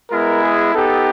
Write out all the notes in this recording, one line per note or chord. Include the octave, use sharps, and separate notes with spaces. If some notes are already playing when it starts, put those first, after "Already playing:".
G#3 B3 E4 A#4
G#4
B3 D#4 G4 A4